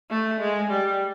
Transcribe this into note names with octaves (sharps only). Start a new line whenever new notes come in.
A3
G#3
G3